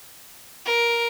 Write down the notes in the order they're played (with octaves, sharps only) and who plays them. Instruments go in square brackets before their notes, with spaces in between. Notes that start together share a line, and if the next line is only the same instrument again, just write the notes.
[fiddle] A#4